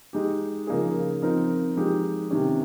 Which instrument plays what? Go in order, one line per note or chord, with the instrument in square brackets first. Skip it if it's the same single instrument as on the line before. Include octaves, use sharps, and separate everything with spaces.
[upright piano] G#3 D#4 G4
C#3 F3 A#3 D#4 G#4
F3 C4 D#4 A#4
F3 G#3 D#4 G4
C3 D#3 A#3 C#4 G4